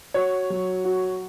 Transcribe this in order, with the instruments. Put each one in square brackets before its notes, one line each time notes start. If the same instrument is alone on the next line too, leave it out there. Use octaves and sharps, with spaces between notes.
[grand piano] F#4 [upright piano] C#5
[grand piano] F#3
F#4